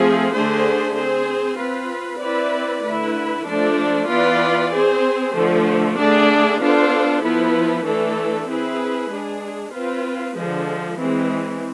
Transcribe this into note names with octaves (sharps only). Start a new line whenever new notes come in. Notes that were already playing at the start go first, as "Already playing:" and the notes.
Already playing: F3 A3 C4 G#4
D3 A3 D4 G#4 C5
C4 G#4 C5
C4 F4 B4
C4 E4 B4 D5
D3 A3 E4 B4
F3 A3 D4 A4 D5
E3 B3 F4 B4 D5
C4 G#4 C5
D3 F3 A3
D3 A3 D4 G#4 D5
B3 D4 F4 A4 C5
F3 B3 E4 B4
E3 A3 D4 A4
C4 E4 G#4 B4
G#3 D4 G#4
C4 F4 B4
D3 F3 G#3
E3 G#3 C4